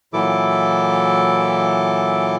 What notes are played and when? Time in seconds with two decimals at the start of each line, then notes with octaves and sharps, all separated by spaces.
0.13 A#2 E3 F#3 E4 A4 D6